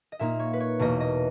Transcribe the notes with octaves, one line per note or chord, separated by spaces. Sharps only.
D#5
A#2 A#3 D#4 E5
C#5
B4
C#5
E2 B2 A#3 D#5
D#5